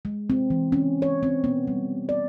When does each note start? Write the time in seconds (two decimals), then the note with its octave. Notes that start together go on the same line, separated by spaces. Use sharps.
0.05 G#3
0.30 C4
0.50 E3
0.72 C#4
1.02 C#5
1.23 C4
1.44 B3
1.67 G3
2.09 D5